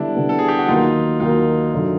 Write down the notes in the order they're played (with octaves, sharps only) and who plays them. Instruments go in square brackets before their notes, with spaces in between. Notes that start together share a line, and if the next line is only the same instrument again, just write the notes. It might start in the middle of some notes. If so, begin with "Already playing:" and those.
Already playing: [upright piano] D3 G3 B3 [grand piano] D4 E4
[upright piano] D3 G3 B3
[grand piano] A4
G#4
G4
F#4
[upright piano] D#2 D#3 F#3 [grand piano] D#4 F4
[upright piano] D#2 D#3 F#3 [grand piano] D#4 F4
[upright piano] F#2 D3 F#3